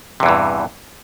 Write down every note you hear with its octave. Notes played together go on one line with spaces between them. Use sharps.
E2 G2 C3 E3